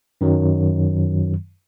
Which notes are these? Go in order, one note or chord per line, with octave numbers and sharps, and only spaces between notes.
F#2 D#3 F#3